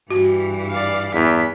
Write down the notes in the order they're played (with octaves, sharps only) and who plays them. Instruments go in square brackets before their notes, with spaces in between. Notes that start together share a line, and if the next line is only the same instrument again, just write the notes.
[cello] G2 E3 [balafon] F#4
[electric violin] D5 F5
[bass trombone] E2 [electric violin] B6